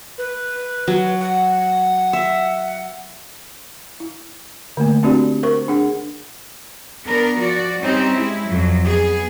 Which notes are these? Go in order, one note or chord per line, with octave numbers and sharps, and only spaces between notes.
B4
F#3
F#5
E5
E4
D3 A3 A#3
C4 D4 F#4 G4 D5
A#4 C5 C#6
D4 G#4 F#5
B3 D4 A#4
F3 F#4 D5
G3 C4 C#4 D#4 G4
G#3 E4
F2 F#3
B3 G#4